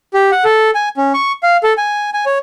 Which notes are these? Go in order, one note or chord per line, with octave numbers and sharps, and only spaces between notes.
G4
F#5
A4
G#5
C#4
C#6
F5
A4
G#5
G#5
C#5